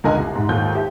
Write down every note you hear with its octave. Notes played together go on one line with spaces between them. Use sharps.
C#2 D3 A#4 D#5 G#5 F#6
C2
G#2
D#2 G#2 F4 A4 G6
G4 E5